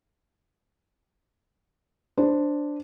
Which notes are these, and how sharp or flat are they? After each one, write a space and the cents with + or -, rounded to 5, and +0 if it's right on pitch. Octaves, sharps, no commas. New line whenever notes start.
D4 +0 C5 +0